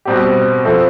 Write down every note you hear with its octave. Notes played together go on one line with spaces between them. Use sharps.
B2 G3 C4 G4
F3 C4 E4 A4